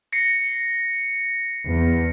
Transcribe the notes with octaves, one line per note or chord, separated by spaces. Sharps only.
A#6 C7 C#7
E2